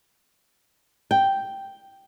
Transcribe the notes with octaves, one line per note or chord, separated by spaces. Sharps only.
G5